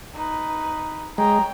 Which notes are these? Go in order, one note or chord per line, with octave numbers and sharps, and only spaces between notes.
D#4 B4
G#3 C#5 G5 A#5